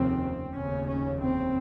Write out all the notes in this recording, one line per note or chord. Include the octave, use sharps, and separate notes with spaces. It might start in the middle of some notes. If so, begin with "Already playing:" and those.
Already playing: F1 D#2 C#3 C4
F1 D#2 C#3 C#4
C#4
C4